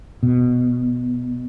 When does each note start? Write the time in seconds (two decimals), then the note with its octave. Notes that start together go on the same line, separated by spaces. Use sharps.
0.23 B2